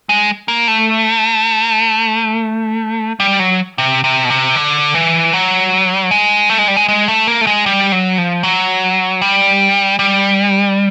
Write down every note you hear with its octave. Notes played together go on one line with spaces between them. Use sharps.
G#3
A#3
A3
G3
F#3
C3
C3
B2
C3
D3
E3
F#3
G#3
A3
G#3
G3
G#3
G#3
A3
A#3
A3
G#3
G3
F#3
F3
F#3
G3
G3